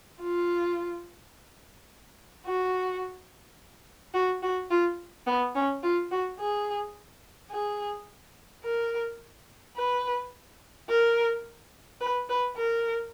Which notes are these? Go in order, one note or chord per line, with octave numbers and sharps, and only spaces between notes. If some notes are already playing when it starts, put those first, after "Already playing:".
F4
F#4
F#4
F#4
F4
B3
C#4
F4
F#4
G#4
G#4
A#4
B4
A#4
B4
B4
A#4